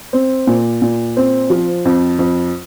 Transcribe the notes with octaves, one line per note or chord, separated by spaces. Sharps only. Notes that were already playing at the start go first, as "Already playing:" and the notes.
C4
A#2
A#2
C4
F3
F2
F2